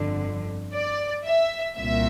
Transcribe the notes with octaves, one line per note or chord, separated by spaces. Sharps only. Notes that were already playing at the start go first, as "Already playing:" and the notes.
Already playing: G1 F2 D3
D5
E5
C2 A#2 E5